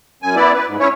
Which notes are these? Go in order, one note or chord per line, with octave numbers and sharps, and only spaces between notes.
F#2 G#5
B3 E4 D5
B4
G#2
C#4 E4 C#5